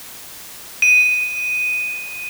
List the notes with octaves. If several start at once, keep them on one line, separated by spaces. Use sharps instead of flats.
D#7